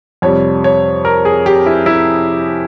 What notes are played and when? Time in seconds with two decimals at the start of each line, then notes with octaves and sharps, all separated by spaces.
0.22 F2 C3 G3 C#5
0.64 C#5
1.05 A#4
1.25 G#4
1.46 G4
1.66 E4
1.86 E4